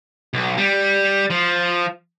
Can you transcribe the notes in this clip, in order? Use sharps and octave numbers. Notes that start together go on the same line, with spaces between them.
B1
G3
F3